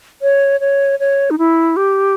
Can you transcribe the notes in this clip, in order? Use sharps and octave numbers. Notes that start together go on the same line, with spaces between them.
C#5
C#5
C#5
D#4
E4
G4